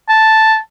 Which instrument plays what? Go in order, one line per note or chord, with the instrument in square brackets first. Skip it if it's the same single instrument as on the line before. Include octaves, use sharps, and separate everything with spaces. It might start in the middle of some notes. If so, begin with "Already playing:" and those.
[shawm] A5